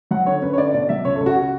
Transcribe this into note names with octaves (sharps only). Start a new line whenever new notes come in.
F#3 F#5
D3 C#5
F#2 B4
C#5
D3 D5
B2 D5
F#3 E5
C#2 C#5
C#2 A4
F#4
F#4